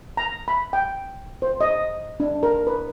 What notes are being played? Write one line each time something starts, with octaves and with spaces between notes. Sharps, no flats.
A#5
B5
G5
C5
D#5
D4
A#4
B4